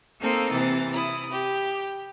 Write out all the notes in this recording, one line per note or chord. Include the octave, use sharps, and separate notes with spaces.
A#3 C4 D#4 A4
C3 E3 A6
E4 D#6
G4